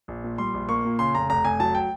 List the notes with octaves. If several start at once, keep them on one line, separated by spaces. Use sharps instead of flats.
A#1
A#2
G3 C6
A#1
A#3 C#6
A#2
C#3 C6
F1 A#5
F1 A#5
F1 G#5
F#3 A5
G5